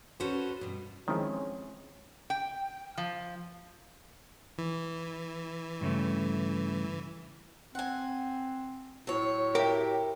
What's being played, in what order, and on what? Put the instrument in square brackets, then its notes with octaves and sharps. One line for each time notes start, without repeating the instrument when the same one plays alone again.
[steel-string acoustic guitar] C#4 F#4 A4 B4 C5
G2 B2
[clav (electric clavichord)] D#3 F3 [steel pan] G#3 C4 E4 [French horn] C#4
[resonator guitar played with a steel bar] G5
F3
[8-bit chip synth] E3
[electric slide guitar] G2 C#3 A3
[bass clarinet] C4 [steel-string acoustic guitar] F#5 G#5
[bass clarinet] A2 [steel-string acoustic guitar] F#3 C#5
[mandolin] G4 [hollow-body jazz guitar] A#4 E5